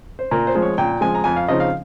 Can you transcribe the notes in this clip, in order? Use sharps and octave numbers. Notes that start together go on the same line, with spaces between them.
C5
A#2 A#4
C5
F3 G#3
C#5
A#2 G5
F3 G#3 G#5
A#5
F2 G#5
F5
C#3 F3 C4 D#4 D#5
F5